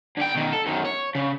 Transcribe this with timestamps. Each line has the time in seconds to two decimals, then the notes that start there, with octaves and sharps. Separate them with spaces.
0.17 D3 G5
0.35 B2 D#3
0.52 A4
0.66 F#2 D#3
0.85 C#5
1.15 C#3